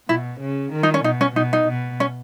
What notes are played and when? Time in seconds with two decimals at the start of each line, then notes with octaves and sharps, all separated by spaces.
0.08 B2 E4
0.41 C#3
0.73 D#3
0.83 D#4
0.94 C#4
1.04 B2 D#4
1.21 C#4
1.36 B2 D#4
1.53 D#4
1.69 B2
2.00 C#4